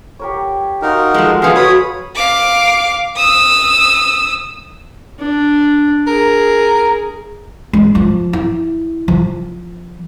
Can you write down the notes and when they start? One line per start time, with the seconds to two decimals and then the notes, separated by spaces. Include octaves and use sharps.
0.19 G4 A#4 C#5
0.82 D#4 F#4 A#4 F5 C6
1.14 F3 G#3 A4 A#5
1.42 F3 B3 G#4 F5
1.56 F#4 B4 C#5 B5 D#6
2.15 F5 D6
3.16 D#6 E6
5.19 D4
6.07 G#4 A#4
7.73 G#3
7.95 F3
8.33 E4
9.08 F3